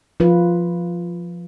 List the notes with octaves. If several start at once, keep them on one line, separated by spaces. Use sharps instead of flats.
F3 F4 B4